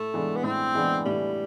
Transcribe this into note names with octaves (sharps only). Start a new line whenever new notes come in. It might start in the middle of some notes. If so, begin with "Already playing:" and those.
Already playing: A2 A3
E3 G#3 B3 D4
B3
A2 C4
E3 G#3 B3 D4
A2 G3